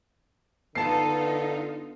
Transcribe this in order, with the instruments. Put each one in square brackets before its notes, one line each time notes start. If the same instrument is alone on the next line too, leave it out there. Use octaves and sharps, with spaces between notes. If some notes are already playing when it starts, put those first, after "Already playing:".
[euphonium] D3 [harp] B3 [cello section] D#4 F4 A4 [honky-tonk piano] A5 C7